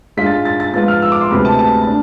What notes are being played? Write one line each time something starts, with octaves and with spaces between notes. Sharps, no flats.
G#2 G#3 D4 F4 B6
A6
A6
A6
G#2 F3 B3 F4 A6
F6
E6
D6
C6
D2 C3 G#3 B3 B5
A5
A5
D4